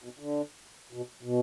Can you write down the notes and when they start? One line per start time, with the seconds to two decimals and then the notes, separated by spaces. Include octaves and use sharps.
0.04 B2
0.19 D3
0.93 B2
1.23 B2